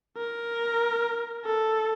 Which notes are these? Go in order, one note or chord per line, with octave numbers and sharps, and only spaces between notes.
A#4
A4